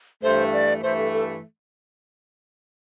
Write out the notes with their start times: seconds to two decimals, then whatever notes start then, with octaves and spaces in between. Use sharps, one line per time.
0.22 G2 E3 A3 C5
0.53 D5
0.82 G2 E3 A3 C5
0.98 A4
1.13 A4